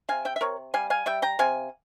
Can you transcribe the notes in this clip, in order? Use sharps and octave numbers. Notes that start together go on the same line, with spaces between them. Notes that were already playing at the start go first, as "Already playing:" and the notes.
C3 F5 G#5
E5 G5
E5
C3 A#4 C#5
G3 F5 G#5
F5 G#5
G3 E5 G5
G5 A#5
C3 F5 G#5